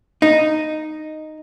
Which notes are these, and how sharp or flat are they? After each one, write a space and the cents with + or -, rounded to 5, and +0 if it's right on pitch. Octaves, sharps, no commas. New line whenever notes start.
D#4 -5